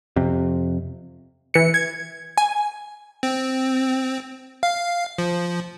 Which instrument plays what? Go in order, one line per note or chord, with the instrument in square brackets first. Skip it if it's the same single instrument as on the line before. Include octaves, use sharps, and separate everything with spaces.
[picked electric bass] F2 C3
[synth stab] E3 C#7
G#6
G#5
[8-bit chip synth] C4
F5
F3